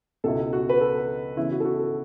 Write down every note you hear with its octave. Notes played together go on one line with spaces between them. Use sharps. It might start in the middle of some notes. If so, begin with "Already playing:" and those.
C#2 B2 B3 E4 A4
F#4
B4
A4
C#3 E3 B3 E4
F#4
A4
F#4
A4